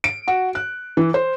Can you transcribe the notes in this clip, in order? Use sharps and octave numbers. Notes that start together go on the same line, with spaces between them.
D7
F#4
F#6
E3
C5